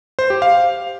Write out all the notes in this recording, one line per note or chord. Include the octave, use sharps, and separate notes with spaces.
C5
G4
F5